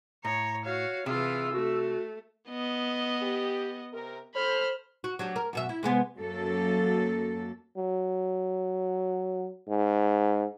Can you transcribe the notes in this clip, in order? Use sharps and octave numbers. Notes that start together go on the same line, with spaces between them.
A2 C#5 A#5
F#4 C#5 F5
C3 E3 F4 G#4 E6
A3 F#4
B3 D#5
G4
C3 A#4
A4 C5 B5 F6
F#4
F#3 D4 G4
A#4
F#2 B2 E5
E4
C3 G#3 B3
F#2 F#3 A#3 A4
F#3
G#2